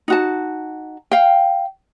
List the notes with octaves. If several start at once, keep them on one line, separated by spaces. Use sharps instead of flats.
D#4 F#4 A5
F5 G5